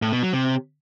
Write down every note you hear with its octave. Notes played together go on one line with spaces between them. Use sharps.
A2
B2
F#3
C3